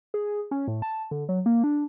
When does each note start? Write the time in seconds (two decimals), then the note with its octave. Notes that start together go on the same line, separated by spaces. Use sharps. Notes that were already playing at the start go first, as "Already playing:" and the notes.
0.14 G#4
0.51 C#4
0.68 A2
0.82 A5
1.11 D3
1.29 F#3
1.46 A#3
1.64 D4